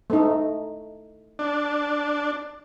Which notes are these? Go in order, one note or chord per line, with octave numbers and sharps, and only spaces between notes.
A3 D#4
D4